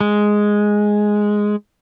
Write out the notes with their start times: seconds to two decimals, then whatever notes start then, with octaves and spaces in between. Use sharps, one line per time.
0.01 G#3